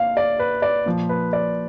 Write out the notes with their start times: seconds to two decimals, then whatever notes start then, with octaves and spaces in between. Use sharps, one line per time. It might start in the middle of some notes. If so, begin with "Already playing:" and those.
Already playing: A#2 F5
0.17 D5
0.40 B4
0.62 D5
0.86 A#2 F3
1.09 B4
1.33 D5